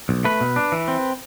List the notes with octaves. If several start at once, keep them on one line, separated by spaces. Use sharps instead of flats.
B1
A3 B4
B2
D4
E3
C4